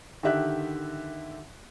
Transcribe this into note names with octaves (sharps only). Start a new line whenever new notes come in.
D3 D#3 G4 E5 F#6